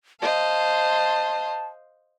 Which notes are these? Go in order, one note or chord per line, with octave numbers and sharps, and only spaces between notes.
C5 D#5 F5 A5